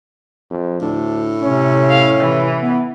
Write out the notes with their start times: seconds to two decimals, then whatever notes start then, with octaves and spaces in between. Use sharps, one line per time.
0.50 F2
0.81 D2 A2 D4
1.42 C3 C#4
1.90 F5
2.20 C3 E3
2.61 B3